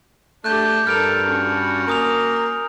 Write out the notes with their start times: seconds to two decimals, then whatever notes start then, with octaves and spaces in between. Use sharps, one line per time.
0.44 A3 D4 G4 F#6 G6
0.87 G2 A4 A#4 F6 D7 F7
1.25 C#4 F#4
1.87 A#3 G#5 D#6 F7